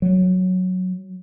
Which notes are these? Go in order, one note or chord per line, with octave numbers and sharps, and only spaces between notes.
F#3